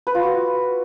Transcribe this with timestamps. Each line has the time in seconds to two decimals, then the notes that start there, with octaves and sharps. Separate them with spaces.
0.07 B4
0.15 F4
0.23 F#4